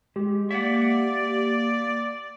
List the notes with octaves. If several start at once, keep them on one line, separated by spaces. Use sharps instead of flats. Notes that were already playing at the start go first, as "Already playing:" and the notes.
G#3 G4
A#3 D5 E5 F#5